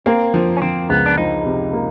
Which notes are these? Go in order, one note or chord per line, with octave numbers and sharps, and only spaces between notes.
A#3 C4
F3
C#4
F3 C4
C#2 B3
D4
F3 D#4
C3
A#3